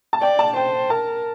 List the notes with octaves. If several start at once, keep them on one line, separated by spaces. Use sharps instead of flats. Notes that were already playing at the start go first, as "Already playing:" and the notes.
A5
D5 G5
A5
C5 G5
A#4 A5